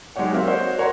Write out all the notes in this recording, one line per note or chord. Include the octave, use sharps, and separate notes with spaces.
F#3 G#3 D#4 G4 C#5 F#5
A#3 C4 E5 F5
F#4 C5 C#5 D#5
A#4 C#5 F#5 A#5 C6